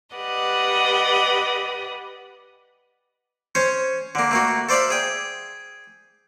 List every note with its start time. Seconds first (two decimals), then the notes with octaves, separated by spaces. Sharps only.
0.16 G4 B4 D5 D#5 F#5
3.55 C#4 C5 C#5
4.15 D3 A#3
4.31 A3 A#3 F#4
4.69 A4 C5 D5 E5 F5 B5
4.90 G#4 G5